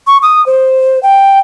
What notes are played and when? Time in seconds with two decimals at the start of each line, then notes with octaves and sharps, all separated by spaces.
0.07 C#6
0.22 D#6
0.46 C5
1.03 G5